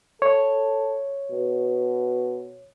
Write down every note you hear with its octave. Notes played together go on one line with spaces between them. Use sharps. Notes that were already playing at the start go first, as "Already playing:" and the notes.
A4 C#5
B2